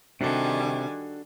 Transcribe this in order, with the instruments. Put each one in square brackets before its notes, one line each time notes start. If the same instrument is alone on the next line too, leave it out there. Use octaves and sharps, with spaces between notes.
[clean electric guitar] C3 [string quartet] D#3 G3 G#5 [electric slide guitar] D4 F#4 A4